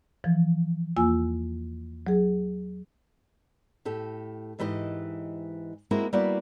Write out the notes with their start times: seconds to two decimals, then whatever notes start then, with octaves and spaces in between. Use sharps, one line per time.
0.24 E3 F3
0.97 E2 A#3 F4 G#5 E6
2.07 F#3 G#4
3.85 A2 G4 A4
4.59 G#2 E3 G4 B4 D#5
5.91 G#3 A#3 C4 E4 F#4
6.13 G3 A#3 B3 E4 F#4 D5